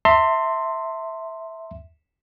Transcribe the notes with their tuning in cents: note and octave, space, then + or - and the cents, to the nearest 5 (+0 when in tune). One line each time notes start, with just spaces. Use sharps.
E5 -10 A5 +45 C6 +0